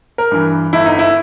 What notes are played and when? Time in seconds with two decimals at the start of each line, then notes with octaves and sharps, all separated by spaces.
0.18 A#4
0.31 G2 E3
0.73 G1 E4
0.86 D#4
0.99 E4